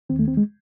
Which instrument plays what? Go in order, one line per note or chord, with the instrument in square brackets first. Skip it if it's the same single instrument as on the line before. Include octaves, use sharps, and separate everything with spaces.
[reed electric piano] D#2 D#3 C4
A3
C4
G#3